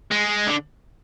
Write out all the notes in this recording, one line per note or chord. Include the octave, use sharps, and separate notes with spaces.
G#3
D3